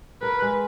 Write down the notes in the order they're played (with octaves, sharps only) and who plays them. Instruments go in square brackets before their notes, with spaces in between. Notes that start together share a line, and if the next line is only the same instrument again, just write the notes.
[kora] A#4 [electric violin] B4
[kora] G#3